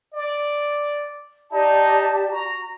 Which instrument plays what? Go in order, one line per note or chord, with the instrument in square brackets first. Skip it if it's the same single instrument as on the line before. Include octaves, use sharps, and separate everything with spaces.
[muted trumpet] D5
[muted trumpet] D#4 [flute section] G4 D5 A5
[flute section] F#4 [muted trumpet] A#5